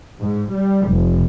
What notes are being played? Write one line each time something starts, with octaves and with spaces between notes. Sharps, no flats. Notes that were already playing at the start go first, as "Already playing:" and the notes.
G#2
G3
F1